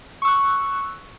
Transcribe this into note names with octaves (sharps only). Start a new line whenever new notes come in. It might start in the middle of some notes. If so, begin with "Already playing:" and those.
C#6 E6 F#6